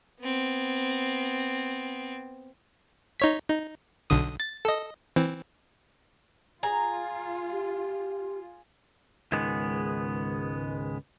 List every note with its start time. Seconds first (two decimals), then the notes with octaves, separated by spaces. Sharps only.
0.21 B3 C4
3.20 D#4 C#5 B6
3.49 D#4
4.10 B1 D3 D#6
4.40 A6
4.65 A4 D#5
5.16 E3 C4
6.63 F4 G#4 A#5
7.51 G4
9.32 C#2 G#2 D#3 G#3 B3